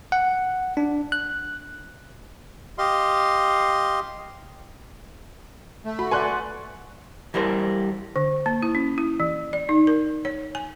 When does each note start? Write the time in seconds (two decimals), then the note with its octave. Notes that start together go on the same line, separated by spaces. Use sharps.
0.12 F#5
0.77 D4
1.12 F#6
2.78 G4 D#5 F5 C6
5.85 A3
5.99 F#4 B5
6.11 B4 D5 F#5 G#5 C6 F#6
7.34 E3 G3 A#4 C5
8.16 D3
8.46 A#3
8.63 E4
8.75 C#4
8.98 E4
9.20 E3
9.53 D5
9.69 D#4
9.87 A#4
10.25 C#5
10.55 G#5